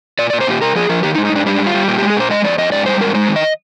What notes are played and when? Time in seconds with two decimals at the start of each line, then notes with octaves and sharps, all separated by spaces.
0.19 A#2 D5
0.30 D5
0.33 A#2
0.41 C5
0.47 A#2 G4
0.61 C3 A#4
0.75 F3 G#4
0.89 F3 A#4
1.03 D#3 G4
1.15 D#4
1.18 G#2
1.25 D#4
1.32 G#2 D4
1.46 G3 D4
1.60 G3
1.67 F4
1.74 G3
1.88 A#2 G4
1.98 G4
2.02 G#3
2.10 G#4
2.16 A#2 C5
2.30 G#3 D#5
2.44 F2 D5
2.58 F2 D#5
2.72 G#2 D5
2.86 G3 C5
3.00 G#2 A#4
3.15 G#3 C5
3.28 D#3
3.36 D#5